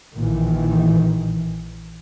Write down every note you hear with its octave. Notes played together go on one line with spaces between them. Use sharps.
A#1 A#2 D#3 E3